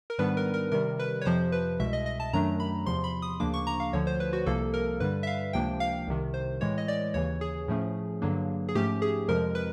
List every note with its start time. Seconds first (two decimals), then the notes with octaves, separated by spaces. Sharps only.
0.10 A#4
0.18 G#2 D#3 G3 B3 D4 B4
0.37 A#4
0.54 A#4
0.72 C3 D#3 G3 A#4
0.99 B4
1.21 C#5
1.25 F2 C3 F3 C5
1.52 B4
1.79 C2 B2 G#3 E5
1.93 D#5
2.06 D#5
2.20 A5
2.33 F#2 D#3 F#3 A3 D4 A#5
2.60 B5
2.86 E2 C3 F3 C6
3.04 B5
3.22 D#6
3.40 D2 C#3 F3 A#3 D4 D6
3.54 C#6
3.67 A#5
3.80 F5
3.93 D2 D3 F3 C#5
4.07 C5
4.20 B4
4.33 F#4
4.46 C2 C3 F3 A#3 A4
4.74 A#4
5.00 G2 D3 G3 B4
5.23 E5
5.27 F5
5.53 C#2 C3 F3 A#3 D4 G5
5.80 F5
6.07 C2 C3 D#3
6.34 C5
6.61 A2 E3 G#3 C#5
6.78 D#5
6.88 D5
7.14 D#2 C#3 E3 C#5
7.41 G#4
7.68 A2 F3 A3 C#4
8.22 G2 D3 F#3 A#3 D4
8.69 G#4
8.75 G#2 F3 A3 C#4 G4
9.02 G#4
9.28 F2 C3 F3 G#3 A#4
9.55 B4